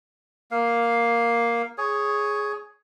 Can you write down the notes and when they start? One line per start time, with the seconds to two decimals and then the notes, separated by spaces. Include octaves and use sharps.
0.51 A#3 F5
1.78 G#4 C#5